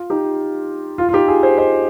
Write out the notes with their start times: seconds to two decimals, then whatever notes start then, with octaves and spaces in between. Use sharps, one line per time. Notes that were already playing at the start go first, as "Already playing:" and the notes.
Already playing: F4
0.10 D#4 G4
0.98 F4
1.09 F4
1.13 D#4 G4
1.28 F4 G#4
1.43 G#4 C5
1.58 C5 D#5